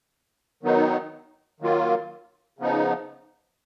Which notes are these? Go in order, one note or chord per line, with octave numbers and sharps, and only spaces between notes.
D#3 F#3 B3 D#4
D#3 F#3 A#3 F4
C#3 F3 B3 D#4